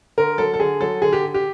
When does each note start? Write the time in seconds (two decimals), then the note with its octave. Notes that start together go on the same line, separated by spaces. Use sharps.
0.17 D3 A#4
0.38 F#3 A4
0.54 A4
0.60 D3 G#4
0.81 F#3 A4
1.02 D3 G#4
1.13 G4
1.23 D3
1.34 G4